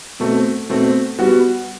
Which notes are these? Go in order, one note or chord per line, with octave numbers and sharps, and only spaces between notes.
B2 A3 C4
B2 A3 C4
G3 B3 F#4